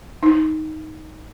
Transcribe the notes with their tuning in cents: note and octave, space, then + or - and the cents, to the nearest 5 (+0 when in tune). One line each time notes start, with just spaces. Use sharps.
D#4 +5